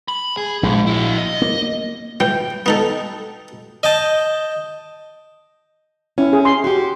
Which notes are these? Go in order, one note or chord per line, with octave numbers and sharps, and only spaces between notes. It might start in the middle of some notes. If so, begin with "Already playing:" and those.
B5
G#4
A#1 G#2
E4 F#4
D#5
A#3
E3 G5
B3 D#4 A4
D#5 G5 A5
C#4 E4
G#4
C6
F#4 G4